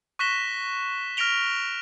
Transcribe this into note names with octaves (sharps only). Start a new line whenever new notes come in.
C#6 F#6 A#6 B6 E7 G7
F6 A#6 B6 D7 F7 G7